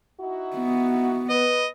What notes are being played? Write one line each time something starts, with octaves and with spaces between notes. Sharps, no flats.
D#4 E4 F#4
B3
B4 D#5